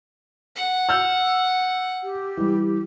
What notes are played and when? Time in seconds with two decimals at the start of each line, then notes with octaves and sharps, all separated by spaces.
0.56 F#5
0.89 E6 F6 G6
2.04 G4
2.37 E3 G3